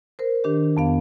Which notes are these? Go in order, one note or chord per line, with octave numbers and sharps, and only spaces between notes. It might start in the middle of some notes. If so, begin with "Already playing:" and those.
A#4 C5
D#3 D4 G4
F2 B3 F5